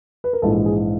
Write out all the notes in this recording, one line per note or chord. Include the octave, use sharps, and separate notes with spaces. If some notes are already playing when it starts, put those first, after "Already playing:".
B4
A#4
A#1 G#2 E3 A4
G#4